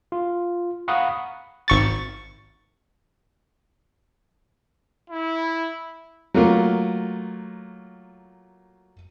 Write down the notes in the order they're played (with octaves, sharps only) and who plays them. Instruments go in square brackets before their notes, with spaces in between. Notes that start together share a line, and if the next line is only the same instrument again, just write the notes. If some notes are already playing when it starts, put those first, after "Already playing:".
[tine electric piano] F4
F5 F#5 A#5 B5 C#6 D#6
[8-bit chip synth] G#1 C#6 A6
[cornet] E4
[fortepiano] F#3 A3 A#3 F4 A#4